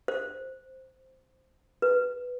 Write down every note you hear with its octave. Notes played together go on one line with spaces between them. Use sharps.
C5
B4